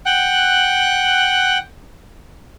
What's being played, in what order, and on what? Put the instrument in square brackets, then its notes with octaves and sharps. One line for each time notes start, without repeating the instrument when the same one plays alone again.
[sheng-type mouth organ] F#5 G5 F#6